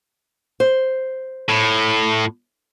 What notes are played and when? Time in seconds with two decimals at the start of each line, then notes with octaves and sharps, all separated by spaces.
0.60 C5
1.49 A2